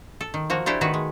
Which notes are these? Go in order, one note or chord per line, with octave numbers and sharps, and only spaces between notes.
A4
D#3
F3 A#3 F#4
A3 D4 E4 G4 A4 C5
D#3 B3 F#4 B4
G#3